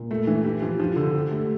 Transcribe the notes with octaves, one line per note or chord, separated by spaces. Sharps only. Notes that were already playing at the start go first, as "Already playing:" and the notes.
Already playing: A#2
A3
E3
G4
F3
F3
D3
G4
A3